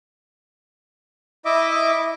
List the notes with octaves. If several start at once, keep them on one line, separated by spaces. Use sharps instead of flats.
E4 D#5 E5 D6